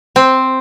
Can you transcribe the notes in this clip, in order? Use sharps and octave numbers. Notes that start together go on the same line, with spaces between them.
C4